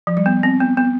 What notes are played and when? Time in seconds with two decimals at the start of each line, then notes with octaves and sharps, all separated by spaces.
0.07 F3
0.17 G3
0.26 B3
0.43 C4
0.60 B3
0.77 B3